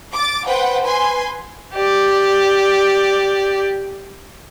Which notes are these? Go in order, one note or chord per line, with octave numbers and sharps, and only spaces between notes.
D6 A6
B4 C5 F#5 G5
B4 G#5 C6
G4 D5